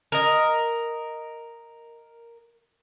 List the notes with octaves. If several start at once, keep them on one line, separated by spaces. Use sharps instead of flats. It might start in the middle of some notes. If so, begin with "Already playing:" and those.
A#4 D#5